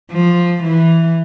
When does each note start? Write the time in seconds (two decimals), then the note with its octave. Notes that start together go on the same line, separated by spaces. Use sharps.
0.12 F3
0.63 E3